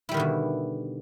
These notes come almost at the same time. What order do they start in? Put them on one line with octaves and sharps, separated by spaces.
E4 G3 D#3 D3 B2